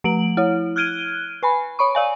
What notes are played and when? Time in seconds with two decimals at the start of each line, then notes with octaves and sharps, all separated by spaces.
0.04 F3 A3 D7 F#7
0.37 E4 C#5
0.76 F6 F#6 G#6 D7 D#7 G7
1.43 B4 G#5 B5
1.79 C#5 B5 C#6
1.95 D5 F5 G#5